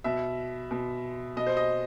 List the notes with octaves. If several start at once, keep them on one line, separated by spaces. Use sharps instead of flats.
B2 E5
B2
B2 D#5
C5
D#5